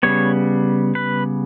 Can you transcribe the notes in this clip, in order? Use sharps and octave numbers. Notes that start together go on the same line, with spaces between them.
C#3 G3 B3 C#5
B4